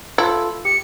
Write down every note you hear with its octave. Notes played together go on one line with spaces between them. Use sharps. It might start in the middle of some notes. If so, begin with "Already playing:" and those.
E4 F4 A4
G4 C#7